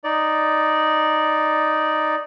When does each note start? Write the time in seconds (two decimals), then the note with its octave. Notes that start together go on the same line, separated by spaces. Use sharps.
0.04 D#4 D5